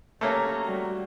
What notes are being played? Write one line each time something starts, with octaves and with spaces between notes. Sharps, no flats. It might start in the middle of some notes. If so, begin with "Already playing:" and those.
A3 A#3 C#4 G4 A#5
G3 F#4